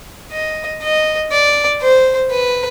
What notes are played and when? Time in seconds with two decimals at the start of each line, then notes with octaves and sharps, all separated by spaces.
0.32 D#5
0.83 D#5
1.32 D5
1.82 C5
2.31 B4